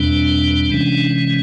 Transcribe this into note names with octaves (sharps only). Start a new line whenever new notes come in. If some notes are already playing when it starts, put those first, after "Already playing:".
Already playing: E2 B2 G3 C4 D4
C3 E3 G#3 C#4